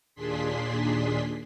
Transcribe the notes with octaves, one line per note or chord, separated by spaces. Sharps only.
D#2 A#2 D4 G#4 C6 B6